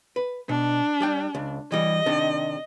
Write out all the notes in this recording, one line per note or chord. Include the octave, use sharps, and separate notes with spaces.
B4
B2 D4
G3 D5 G5
C#2
E3 G3 D#5
C3 D#3 D4